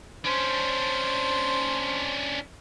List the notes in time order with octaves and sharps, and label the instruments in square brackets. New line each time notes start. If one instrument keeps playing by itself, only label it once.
[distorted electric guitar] C#4 D4 [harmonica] C5